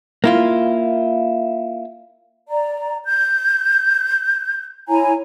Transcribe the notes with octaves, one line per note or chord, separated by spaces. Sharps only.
A#3 E4 F4
D5 A#5
G6
E4 C#5 G#5 A#5